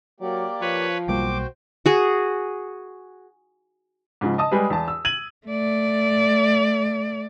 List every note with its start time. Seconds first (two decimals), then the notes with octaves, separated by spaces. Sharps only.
0.20 F#3 A#3 G4 D5
0.61 F3 B4 C#5
1.08 B1 G3 A#3 F#4 C5 G5 D6
1.86 F#4 G#4
4.21 G#2 C#3 F3
4.38 D#5 A5 D#6
4.52 G3 G#3 G#4 B4
4.70 E2 A5
4.88 E6
5.05 G#6 D#7 F#7
5.47 A3 D5